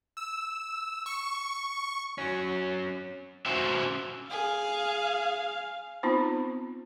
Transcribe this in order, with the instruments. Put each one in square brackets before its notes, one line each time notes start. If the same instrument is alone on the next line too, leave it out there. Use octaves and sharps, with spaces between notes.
[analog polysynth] E6
C#6
[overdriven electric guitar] F#3 C#4
[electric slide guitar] C#4 F#4 C5 E5
[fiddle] G#4 [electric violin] F5
[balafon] B3 C4 D#4 F4 C5 B5